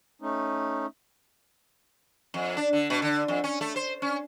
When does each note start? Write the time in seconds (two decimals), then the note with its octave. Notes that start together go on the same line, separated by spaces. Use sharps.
0.22 A3 C#4 D#4
2.34 F2
2.57 D4
2.73 D3
2.90 B2
3.02 D3
3.28 F2
3.44 C#4
3.61 A3
3.76 C5
4.02 C#4